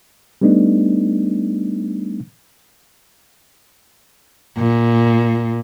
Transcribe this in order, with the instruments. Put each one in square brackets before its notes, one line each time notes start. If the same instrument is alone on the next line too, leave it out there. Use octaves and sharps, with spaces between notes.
[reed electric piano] G3 A3 B3 D4 D#4
[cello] A#2